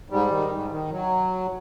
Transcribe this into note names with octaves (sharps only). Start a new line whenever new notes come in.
G#2 G3
D#3
G#2
D#3
F#3